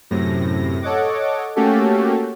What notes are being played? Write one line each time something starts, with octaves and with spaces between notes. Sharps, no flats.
F#2 A2 C3 A#6
A4 C#5 D#5 F#5 D6
A3 A#3 C#4 F#4 G4 A4